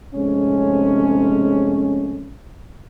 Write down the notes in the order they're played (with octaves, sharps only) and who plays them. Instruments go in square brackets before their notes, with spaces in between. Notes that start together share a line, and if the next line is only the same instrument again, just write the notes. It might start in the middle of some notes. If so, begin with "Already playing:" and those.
[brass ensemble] F2 G#2 C3 G#3 A3 C#4